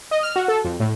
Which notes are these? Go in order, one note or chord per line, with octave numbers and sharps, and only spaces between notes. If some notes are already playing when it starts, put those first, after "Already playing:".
D#5
F6
F#4
A4
F2
A2